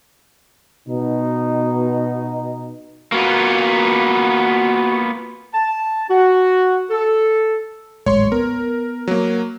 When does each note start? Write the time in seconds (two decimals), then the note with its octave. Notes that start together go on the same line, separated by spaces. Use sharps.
0.88 B2 D#4
3.12 A#3 B3 F4 F#4
5.54 A5
6.09 F#4
6.91 A4
8.06 D1 G#1 G#3 C#5 C6
8.32 B3 A#4
9.08 F#3 A#3